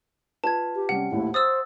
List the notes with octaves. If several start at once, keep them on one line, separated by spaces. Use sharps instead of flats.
F4 B4 A5 G#6
G4
C3 G3 C#4 F#5
A#1 D#2 A2 E4
C5 D#6 E6 A6